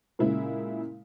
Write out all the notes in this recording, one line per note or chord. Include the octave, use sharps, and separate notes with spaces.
A#2 C#3 G#3 E4